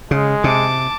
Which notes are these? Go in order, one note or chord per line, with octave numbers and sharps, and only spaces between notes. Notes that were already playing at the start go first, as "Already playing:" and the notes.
C#3 G#3
C3 A5 D6